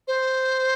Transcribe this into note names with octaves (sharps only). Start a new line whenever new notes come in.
C5